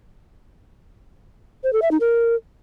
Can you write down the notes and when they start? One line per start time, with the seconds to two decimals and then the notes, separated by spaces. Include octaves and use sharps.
1.64 C5
1.73 A4
1.82 E5
1.91 D#4
2.00 A#4